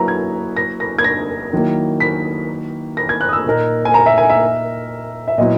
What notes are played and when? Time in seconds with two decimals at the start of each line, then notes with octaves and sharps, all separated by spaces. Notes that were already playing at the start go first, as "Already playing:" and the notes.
Already playing: F#3 A#3 E4 B4 A#5
0.08 G#6
0.57 A#6
0.80 A#6
0.98 G#6
1.04 A#6
1.53 D#3 F#3 A#3 E4
2.00 B6
2.97 A#6
3.09 G#6
3.21 F#6
3.29 D#6
3.33 E6
3.46 A#2 A#3 D#4 A#4
3.85 G#5
3.94 A#5
4.06 E5
4.18 G#5
4.29 E5
5.28 E5
5.38 A#2 F#3 B3 E4 D#5